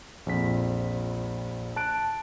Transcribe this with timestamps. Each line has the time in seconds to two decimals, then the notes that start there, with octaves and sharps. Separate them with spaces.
0.26 A#1 F2 B6
1.76 A5 F#6 D7